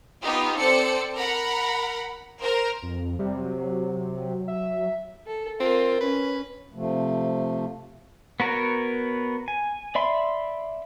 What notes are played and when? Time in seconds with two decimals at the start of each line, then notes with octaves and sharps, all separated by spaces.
0.21 B3 D#4 F4 G4
0.57 C4 A4 C5 D5 C#7
1.17 A#4 F#5 A#5 B5
2.41 A#4 C5
2.82 F2
3.19 C3 G3
3.37 F#3
4.48 E5
5.27 A4
5.60 C4 F4 A#4
6.01 C#4 B4
6.74 C3 F3 A3
8.40 B3 F#4 A#4 B4 C#5
9.48 G#5
9.95 D5 E5 B5 C6